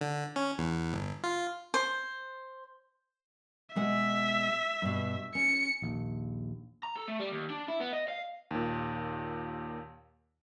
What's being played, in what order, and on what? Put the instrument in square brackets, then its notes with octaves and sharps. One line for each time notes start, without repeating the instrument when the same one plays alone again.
[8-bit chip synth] D3
C#4
E2
G1
F4
[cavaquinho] C5
[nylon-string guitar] B2 G#3 F#5 [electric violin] E5
[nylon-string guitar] G2 B2
[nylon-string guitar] C#4 [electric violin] C#7
[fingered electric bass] A#1 D#2
[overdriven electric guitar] A#5
A4
A3
G3
D#2
D4
E4
B3
D#5
F5
[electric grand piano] D#2 A#2